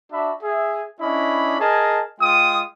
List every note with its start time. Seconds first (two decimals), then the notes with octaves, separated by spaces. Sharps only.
0.11 D4 F#4 E5 A5 B5
0.43 G#4 E5
1.00 C#4 D4 E4 D#5 B5
1.59 G#4 A#4 D#5 G#5 A5
2.20 G#3 F4 G5 D#6